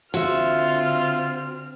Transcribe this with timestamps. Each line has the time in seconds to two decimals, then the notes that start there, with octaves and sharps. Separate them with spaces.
0.14 D3 C4 F4 F#4 E5 F6